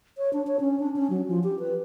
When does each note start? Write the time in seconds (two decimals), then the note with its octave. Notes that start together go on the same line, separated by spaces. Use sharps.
0.18 C#5
0.33 D4
0.47 C#5
0.60 C#4
0.80 D4
0.96 C#4
1.10 F#3
1.28 F3
1.44 G4
1.59 B4